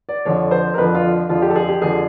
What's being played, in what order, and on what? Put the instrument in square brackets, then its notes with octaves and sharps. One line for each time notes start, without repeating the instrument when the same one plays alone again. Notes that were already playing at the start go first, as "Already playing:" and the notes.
[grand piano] D5
F2 D3 F3 C#5
C5
A#4
F2 D3 F3 B4
F4
F2 D3 F3 F4
G4
A4
G#4
G4
F2 D3 F3 G#4